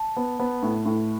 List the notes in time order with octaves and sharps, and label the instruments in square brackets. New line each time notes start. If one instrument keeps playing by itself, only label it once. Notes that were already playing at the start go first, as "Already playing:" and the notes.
Already playing: [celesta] A5
[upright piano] B3
B3
A2
A2